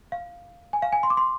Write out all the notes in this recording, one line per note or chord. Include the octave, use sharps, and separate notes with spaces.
F5
G#5
F5
G#5
C6
D6
C6